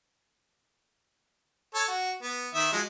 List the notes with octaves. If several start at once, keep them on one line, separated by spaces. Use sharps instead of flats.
A4 C#5
F#4
B3
D#3 E5 D#6
F3 F#3 G#3